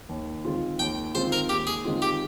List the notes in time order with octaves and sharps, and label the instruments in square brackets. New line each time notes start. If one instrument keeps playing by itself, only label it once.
[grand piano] D#2
D#3 G#3 C4 F4
[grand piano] D#2 [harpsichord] G5
[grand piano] D#3 G#3 C4 F4 [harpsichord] C5
[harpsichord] A#4
[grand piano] D#2 [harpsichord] G4
[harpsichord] G#4
[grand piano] D#3 G#3 C4 F4
[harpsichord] G4